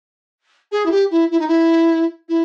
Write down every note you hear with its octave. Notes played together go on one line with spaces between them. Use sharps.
G#4
E4
G4
E4
E4
D#4
E4
E4